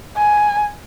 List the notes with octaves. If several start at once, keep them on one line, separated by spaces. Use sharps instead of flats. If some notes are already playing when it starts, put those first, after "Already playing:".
G#5